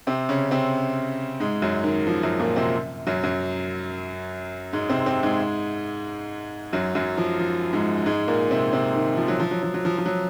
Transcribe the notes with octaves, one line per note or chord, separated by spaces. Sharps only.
C3 C4
C#3 C#4
C3 C4
G#2 G#3
F#2 F#3
D#3
F3
F#2 F#3
A#2 A#3
C3 C4
F#2 F#3
F#2 F#3
G#2 G#3
C3 C4
C3 C4
G#2 G#3
F#2 F#3
F#2 F#3
F3
F3
G#2 G#3
G#2 G#3
A#2 A#3
C3 C4
C3 C4
D#3
F3
F#3
F3
F#3
F3
F#3
F3
F3
F#3